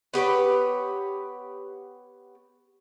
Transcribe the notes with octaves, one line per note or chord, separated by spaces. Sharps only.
B3 G4 B4 C#5